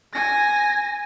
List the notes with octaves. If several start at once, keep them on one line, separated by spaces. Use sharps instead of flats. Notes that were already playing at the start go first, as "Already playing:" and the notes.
G#5 A#6